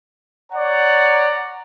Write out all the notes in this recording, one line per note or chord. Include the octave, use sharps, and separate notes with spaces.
C#5 D5 F#5 A#5